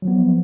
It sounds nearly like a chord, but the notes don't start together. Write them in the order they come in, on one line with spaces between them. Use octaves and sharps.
F#3 F3 B3